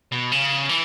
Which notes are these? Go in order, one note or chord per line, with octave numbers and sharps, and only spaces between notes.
B2
C#3
E3